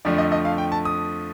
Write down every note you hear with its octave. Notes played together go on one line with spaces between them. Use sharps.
F2 D3 F3 A3 D5
D#5
D#5
F5
G5
A5
D#6